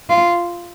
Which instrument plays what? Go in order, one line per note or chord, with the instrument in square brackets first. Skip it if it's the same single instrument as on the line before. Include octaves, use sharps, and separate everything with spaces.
[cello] F4